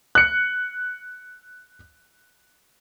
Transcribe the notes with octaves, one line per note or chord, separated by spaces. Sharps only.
F#6 C#7